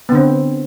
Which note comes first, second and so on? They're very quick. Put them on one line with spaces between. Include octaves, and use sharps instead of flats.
B3 D3 C4